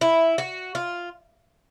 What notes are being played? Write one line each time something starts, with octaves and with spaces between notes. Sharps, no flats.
E4
F#4
F4